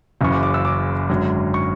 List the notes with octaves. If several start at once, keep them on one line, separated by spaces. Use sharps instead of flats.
F#1 F#2 C#3 E3 C#6
D6
D6
E6
D6
G#1 F#2 D3 F#3
C#6